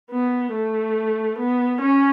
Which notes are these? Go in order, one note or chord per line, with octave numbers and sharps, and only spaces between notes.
B3
A3
B3
C#4